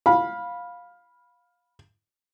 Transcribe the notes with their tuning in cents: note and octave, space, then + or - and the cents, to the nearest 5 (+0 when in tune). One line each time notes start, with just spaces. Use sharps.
F5 +15 B5 -10